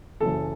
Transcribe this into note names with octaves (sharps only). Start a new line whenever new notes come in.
F#1 F#2 C#3 E3 A4